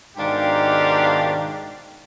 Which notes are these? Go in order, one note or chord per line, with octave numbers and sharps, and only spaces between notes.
G#2 B2 D#3 D4 G4 F5